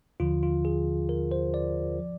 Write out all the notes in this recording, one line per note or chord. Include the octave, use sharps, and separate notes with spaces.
D#2 D3 F3 F4
F4
G#4
A#4
C5
D5
F3